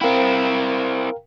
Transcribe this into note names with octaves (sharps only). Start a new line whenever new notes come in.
C4 E4 A#4 F5 G5